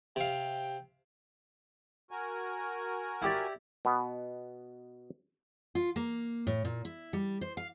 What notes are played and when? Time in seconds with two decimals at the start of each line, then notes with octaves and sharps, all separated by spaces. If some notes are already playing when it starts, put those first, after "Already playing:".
0.16 C3 F5 G5
2.11 F#4 A#4 G#5
3.22 E4 G4 D5
3.85 B2 B3
5.75 F4
5.96 A#3
6.47 A2
6.64 A#2
6.85 E4
7.13 G3
7.41 C5
7.57 F5